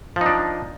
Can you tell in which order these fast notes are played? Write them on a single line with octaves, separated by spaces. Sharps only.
F3 D#4 D4